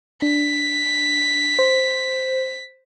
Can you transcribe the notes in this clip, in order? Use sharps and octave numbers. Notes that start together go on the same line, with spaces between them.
D4 B6
C5